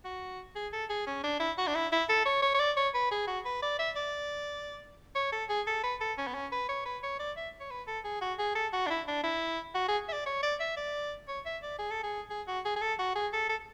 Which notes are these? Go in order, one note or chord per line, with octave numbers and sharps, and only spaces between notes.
F#4
G#4
A4
G#4
C#4
D4
E4
F#4
D4
E4
E4
A4
C#5
C#5
C#5
D5
C#5
B4
G#4
F#4
B4
D5
E5
D5
C#5
A4
G#4
A4
B4
A4
C#4
B3
C#4
B4
C#5
B4
C#5
D5
E5
C#5
B4
A4
G#4
F#4
G#4
A4
F#4
D4
E4
D4
E4
F#4
G#4
E5
D5
C#5
D5
E5
D5
C#5
E5
D5
G#4
A4
G#4
G#4
F#4
G#4
G#4
A4
F#4
G#4
A4
A4